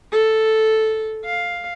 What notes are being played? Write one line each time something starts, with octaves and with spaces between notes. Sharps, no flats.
A4
F5